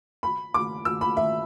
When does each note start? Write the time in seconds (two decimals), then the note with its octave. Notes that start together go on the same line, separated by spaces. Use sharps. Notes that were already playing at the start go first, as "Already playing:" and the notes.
0.23 B5
0.54 D6
0.85 E6
1.01 B5
1.17 E5